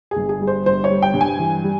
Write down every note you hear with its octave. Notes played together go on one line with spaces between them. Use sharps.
G#4
G1
G#4
G3
C5
G1 C5
C#5
G3
G5
G2
G#5
E3
G3